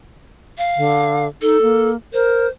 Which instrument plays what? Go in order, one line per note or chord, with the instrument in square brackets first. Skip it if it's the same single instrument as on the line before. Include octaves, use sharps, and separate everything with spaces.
[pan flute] F5
[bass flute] D3
[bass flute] D#4 [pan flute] A4
[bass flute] A#3
[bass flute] A#4 [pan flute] C5